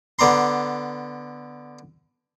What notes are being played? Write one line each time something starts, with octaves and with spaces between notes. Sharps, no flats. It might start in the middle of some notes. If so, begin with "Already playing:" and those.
D3 B3 D5 A#5 C6